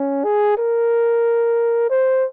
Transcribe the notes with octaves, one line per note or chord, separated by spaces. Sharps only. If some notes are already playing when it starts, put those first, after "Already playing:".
Already playing: C#4
G#4
A#4
C5